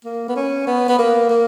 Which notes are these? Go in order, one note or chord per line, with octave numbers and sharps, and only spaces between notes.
A#3
B3
C#4
B3
B3
A#3
A#3